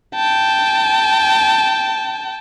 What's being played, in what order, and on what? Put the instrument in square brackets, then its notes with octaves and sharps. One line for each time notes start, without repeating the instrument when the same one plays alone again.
[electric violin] G5 A5